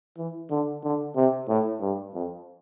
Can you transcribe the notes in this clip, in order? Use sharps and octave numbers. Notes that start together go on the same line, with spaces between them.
E3
D3
D3
C3
A2
G2
F2